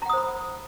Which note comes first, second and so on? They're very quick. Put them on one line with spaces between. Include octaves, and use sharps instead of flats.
A#5 F#5 D#6 C5 B5